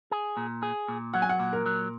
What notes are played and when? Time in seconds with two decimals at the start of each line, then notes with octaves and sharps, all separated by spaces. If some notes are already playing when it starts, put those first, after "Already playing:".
0.11 G#4
0.37 A#2
0.63 G#4
0.88 A#2
1.14 F#3 F#5
1.22 G#5
1.29 F#5
1.40 A#2
1.53 A#4
1.66 F#3